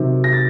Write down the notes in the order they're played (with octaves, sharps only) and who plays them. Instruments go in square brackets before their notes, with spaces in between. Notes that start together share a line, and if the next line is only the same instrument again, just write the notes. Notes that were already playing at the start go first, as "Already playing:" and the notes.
Already playing: [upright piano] C3 D#3 F#3
A#6
A6